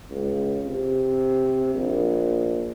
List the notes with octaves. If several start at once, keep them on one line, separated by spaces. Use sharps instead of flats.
C#2
C3
A#1